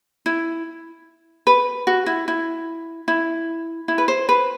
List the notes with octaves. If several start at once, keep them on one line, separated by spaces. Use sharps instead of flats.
E4
B4
F#4
E4
E4
E4
E4
B4
C5
B4